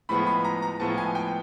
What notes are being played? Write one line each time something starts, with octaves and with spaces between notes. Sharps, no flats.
A2 F3 G#3 B3 B5
B5
A#5
A#5
A2 F3 G#3 B3 A5
G#5
G5